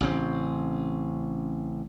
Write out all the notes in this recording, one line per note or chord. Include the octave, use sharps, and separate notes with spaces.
A1 C#3 C4